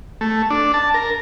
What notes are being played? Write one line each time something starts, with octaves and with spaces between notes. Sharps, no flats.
A3
D4
A5
A#4